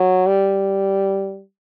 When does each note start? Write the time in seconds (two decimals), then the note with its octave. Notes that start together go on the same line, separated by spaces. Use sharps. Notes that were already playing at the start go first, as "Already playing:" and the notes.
Already playing: F#3
0.27 G3